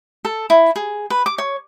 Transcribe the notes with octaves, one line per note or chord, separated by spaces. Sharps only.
A4
E4
G#4
B4
D6
C#5